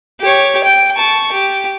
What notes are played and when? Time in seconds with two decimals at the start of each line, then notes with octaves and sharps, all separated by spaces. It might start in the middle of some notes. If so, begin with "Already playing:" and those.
0.21 G4 C#5
0.63 G5
0.96 A5 C#6
1.32 G4